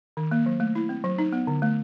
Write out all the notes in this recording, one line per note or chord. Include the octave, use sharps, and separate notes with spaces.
D#3
A#3
F#3
A3
E4
C4
F#3
D#4
B3
D3
A3